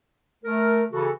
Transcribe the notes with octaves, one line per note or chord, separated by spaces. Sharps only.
A3 A#4
C#3 E3 F#4 A4